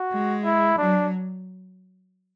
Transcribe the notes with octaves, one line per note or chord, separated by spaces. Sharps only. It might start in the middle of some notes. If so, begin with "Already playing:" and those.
Already playing: F#4
G#3
E4
F#3 D4